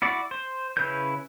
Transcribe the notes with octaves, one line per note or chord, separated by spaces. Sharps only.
E4 F#4 D5
C5
C#3 E4 B4 C#5 G6